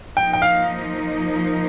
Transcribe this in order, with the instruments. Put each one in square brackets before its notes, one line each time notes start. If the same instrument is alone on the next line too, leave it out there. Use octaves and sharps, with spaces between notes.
[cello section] F3 A#3 D#4 [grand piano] G5
[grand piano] G5
F5